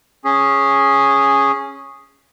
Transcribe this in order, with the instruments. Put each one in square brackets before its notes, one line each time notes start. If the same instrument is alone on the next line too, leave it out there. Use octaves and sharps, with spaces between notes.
[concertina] C#4 G#4